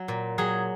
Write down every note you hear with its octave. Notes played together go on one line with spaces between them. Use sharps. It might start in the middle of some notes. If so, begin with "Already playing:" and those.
Already playing: F#3
A#2
F#3 G#4